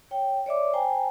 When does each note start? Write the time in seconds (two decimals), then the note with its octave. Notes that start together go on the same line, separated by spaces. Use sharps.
0.11 C#5 G5
0.46 C#5 D5 E5 D6
0.73 C5 G5 G#5 A#5